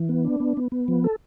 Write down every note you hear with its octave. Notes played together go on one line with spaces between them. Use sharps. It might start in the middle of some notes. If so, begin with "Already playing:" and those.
Already playing: E3
B3
D4
B3
B3
B3
F3
A4